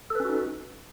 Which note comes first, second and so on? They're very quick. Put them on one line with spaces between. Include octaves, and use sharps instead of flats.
A4 B4 C#4 F#4 D#4